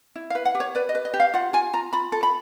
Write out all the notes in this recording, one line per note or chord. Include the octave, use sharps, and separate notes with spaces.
E4
F5
B4
F#5
G4
C#5
B4 D5
D#5
B4
D#5
G4
F5
F4 F#5
F4 G#5
F4 A#5
F4 B5
A4
B5